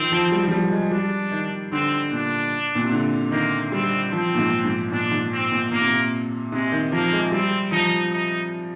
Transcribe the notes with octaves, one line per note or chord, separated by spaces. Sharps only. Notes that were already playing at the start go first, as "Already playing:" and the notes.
Already playing: D#3 F3 C4
F3
G3
F3
G3
G#3
G3 D4
D#3
D3 C4
A#2 D4
A#2
C3
D3
D#3 A#3
G3 C4
F3 C4
A#2
G#2
G#2
A#2 D4
G#2
C4
A#2
A#2 A#3
C3
A#2
C3 G#3
D#3
F3 A#3
G#3
G3 C4
F3 D#4
D#4